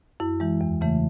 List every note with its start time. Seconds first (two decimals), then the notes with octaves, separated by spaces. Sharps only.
0.20 F#2 E4
0.40 E3 G#3
0.61 E2
0.81 C#3 E3 A3